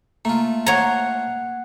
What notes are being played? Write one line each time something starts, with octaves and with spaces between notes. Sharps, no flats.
A3 A#3 F4
C#5 F#5 A#5 C#7